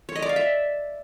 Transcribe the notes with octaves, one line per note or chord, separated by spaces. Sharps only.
C#5
D#5
D5
F5
E5